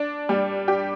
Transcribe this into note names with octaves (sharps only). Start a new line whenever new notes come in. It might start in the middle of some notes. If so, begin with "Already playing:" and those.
Already playing: D4
G3
G4